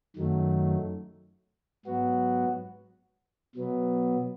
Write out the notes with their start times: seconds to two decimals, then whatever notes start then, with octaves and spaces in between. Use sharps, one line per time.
0.16 F#2 D#3 F#3 A3
1.86 G#2 F#3 B3 F#4
3.55 B2 F#3 B3